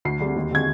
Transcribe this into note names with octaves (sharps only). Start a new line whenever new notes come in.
D2 C7
D3 G3 C4
D#2
D3 G#3 C4 G#6